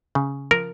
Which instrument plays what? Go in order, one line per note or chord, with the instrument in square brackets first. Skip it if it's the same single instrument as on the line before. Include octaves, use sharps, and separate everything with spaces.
[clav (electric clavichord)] C#3
F3 A#4